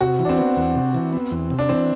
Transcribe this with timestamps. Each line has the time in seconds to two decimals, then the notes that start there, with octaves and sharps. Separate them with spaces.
0.01 C3 F#4
0.19 E3
0.25 D4
0.29 C4
0.38 B3
0.57 E2
0.75 C3
0.94 E3
1.13 B3
1.31 E2
1.50 C3
1.59 D4
1.69 E3 C4